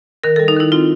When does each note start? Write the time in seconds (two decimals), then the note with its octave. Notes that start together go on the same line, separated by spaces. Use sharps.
0.24 D#3 A#4
0.36 G3 A4
0.48 D#4
0.56 D#3 E4
0.72 C4 F4